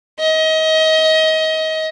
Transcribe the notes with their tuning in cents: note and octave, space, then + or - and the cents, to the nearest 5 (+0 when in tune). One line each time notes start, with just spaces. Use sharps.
D#5 +30